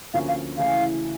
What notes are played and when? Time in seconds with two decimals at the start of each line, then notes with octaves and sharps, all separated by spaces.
0.14 D2 D3 F3 A#3 C#4 F5
0.28 F5
0.58 C#3 E3 A3 C#4 F5